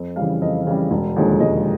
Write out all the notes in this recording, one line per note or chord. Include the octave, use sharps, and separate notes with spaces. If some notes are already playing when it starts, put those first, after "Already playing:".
Already playing: F2
C#3 E3 G3 F5
F2 D#5
C#3 E3 G3
E1
D#2 D3 F3 G#3
E1 D#5